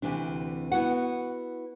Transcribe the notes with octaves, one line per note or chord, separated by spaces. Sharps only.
D2 C3 E3 D4
B3 E4 F#4 F#5